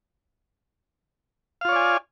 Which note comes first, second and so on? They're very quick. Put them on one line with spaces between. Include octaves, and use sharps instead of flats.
F5 F4 C#5 D5 G#5